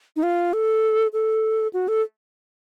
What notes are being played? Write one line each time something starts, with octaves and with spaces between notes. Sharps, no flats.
D#4
F4
A4
A4
F#4
A4